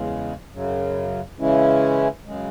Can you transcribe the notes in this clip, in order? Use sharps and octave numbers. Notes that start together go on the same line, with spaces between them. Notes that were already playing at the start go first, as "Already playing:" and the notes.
Already playing: E2 C#3 G#3
F#2 C#3 F#3
C#3 E3 G#3 C#4 E4
F#2 C#3 G#3